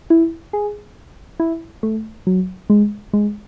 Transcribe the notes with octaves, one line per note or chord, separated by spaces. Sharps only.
E4
G#4
E4
A3
F#3
G#3
G#3